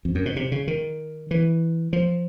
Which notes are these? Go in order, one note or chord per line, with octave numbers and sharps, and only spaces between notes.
F2
F#2
B2
C3
C#3
D#3
E3
F3